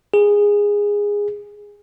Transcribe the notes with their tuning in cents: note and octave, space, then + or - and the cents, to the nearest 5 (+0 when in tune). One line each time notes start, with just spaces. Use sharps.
G#4 -15